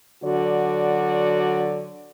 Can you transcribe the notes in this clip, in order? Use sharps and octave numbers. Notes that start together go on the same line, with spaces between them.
D3 F#3 F#4 D5